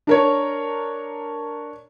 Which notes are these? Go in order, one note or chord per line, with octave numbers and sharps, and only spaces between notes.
D4 A#4 C#5